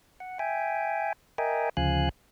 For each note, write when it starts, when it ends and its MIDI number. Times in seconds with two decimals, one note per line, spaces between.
0.20 0.38 78
0.39 1.13 76
0.39 1.13 79
0.39 1.13 80
1.38 1.69 70
1.38 1.69 75
1.38 1.69 76
1.38 1.69 79
1.38 1.69 80
1.77 2.09 38
1.77 2.09 49
1.77 2.09 53
1.77 2.09 77
1.77 2.09 80
1.77 2.09 90